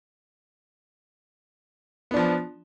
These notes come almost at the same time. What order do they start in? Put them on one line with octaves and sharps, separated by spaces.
B3 D4 F3